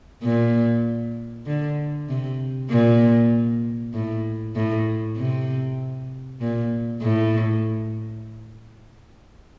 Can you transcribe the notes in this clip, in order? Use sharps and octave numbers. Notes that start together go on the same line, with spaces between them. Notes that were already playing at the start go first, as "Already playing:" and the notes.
A#2
D3
C3
A#2
A2
A2
C3
A#2
A2